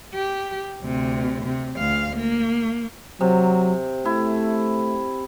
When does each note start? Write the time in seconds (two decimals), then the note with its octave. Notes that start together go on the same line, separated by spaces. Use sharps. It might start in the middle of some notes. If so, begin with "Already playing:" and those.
0.14 G4
0.81 D2 C3
1.45 C3
1.77 D2 F5
2.16 A#3
3.21 C3 F#3
4.05 A3 E4